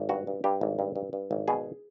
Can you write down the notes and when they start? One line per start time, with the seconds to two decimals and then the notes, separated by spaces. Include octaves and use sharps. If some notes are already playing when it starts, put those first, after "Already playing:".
Already playing: G#1
0.09 G2 F#4
0.27 G2
0.44 G2 G4
0.61 G#1
0.79 G2
0.96 G2
1.13 G2
1.31 G#1
1.48 B2 G#4